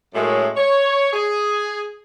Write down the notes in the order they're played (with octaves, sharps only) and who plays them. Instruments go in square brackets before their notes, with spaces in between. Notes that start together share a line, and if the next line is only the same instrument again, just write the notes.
[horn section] F#2 A2 G#3
C#5
G#4